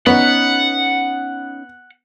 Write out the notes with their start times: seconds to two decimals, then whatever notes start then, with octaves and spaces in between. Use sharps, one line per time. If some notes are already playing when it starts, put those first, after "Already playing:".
0.06 B3 C#4 D#4 F#5